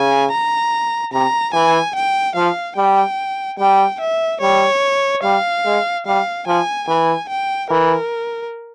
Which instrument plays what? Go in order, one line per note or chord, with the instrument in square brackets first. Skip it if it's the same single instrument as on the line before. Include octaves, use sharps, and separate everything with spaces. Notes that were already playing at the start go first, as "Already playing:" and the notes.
Already playing: [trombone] C#3 [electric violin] G#5
[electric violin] A#5
[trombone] C3 [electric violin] A#5
[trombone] E3 [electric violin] G#5
[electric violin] G5
[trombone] F3 [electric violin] F5
[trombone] G3 [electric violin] G5
[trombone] G3 [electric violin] G5
[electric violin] E5
[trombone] G3 [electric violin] C#5
[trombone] G3 [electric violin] F5
[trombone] G#3
[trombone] G3 [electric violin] F5
[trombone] F3 [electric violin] G#5
[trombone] E3 [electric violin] G#5
[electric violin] G5
[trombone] E3 [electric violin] A#4